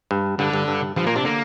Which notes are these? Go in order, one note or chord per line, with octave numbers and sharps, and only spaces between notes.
G2
G2 D3
G2
G2
G2 F3
A#2 A#3
C3 D4
D3 A#3